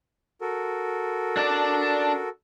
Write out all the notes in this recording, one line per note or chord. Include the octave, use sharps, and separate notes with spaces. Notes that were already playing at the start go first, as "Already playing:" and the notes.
F#4 A4 A#4
D4 D5